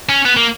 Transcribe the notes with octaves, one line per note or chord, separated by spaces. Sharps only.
C#4
B3
A#3